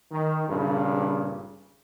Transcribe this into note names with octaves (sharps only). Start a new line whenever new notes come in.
D#3
G#1 G2 A#2 C#3